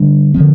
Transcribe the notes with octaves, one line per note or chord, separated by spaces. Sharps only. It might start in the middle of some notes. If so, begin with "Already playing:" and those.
Already playing: D3 G3 D4
D3 F3 C4